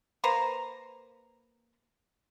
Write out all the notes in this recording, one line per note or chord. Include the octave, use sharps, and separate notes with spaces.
A#3 B4 C5 A#5